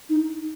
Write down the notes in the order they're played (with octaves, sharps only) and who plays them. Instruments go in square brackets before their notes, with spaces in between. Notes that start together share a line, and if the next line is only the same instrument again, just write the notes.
[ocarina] D#4